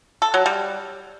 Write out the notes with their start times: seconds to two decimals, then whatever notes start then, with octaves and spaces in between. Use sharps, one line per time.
0.22 A4
0.34 F#3
0.46 G3